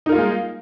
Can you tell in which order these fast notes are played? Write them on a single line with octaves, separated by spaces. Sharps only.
D#4 A#4 F4 A#3 G#3